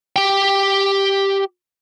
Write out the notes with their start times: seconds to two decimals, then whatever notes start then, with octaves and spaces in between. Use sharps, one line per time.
0.16 G4 G5